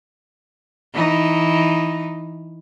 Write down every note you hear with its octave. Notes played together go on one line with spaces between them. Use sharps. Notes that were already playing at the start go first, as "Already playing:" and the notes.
E3 D#4